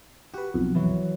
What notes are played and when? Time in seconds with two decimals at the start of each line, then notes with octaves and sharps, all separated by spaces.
0.34 F#4 G4 B4
0.54 B1 F2
0.75 E3 F#3